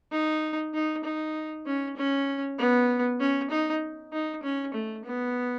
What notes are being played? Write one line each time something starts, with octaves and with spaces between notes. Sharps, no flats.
D#4
D#4
D#4
C#4
C#4
B3
C#4
D#4
D#4
C#4
A3
B3